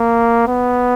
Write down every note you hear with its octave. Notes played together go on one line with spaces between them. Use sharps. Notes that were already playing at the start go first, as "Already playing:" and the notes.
Already playing: A#3
B3